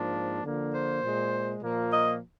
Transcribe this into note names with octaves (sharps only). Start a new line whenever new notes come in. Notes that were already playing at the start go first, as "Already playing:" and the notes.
Already playing: G#2 F3 A#3 D4
D3 F3 A#3
C5
A#2 G#3
A#2 F3 A#3
D#5